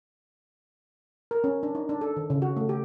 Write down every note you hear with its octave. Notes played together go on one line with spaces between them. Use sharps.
A#4
C#4
D4
D#4
D4
A4
D#3
C#3
F#4
A3
G4